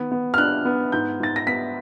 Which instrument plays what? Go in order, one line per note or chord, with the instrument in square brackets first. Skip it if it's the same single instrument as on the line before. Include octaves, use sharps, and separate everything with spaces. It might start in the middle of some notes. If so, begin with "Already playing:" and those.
Already playing: [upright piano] D#3 B3
B3
F6
D4 F#6
B3
G#2 G6
G#2 A6
A#6
B3 B6